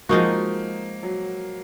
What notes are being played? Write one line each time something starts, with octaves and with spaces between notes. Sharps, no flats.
F3 G#3 A#3 D#4 F#4
F#3